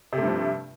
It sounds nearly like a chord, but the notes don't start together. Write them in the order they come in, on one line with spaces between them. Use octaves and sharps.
C3 A3 G2 F3